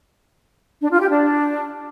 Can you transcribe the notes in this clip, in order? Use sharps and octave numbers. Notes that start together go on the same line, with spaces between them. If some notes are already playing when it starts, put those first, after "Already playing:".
D4
F4
G4
D4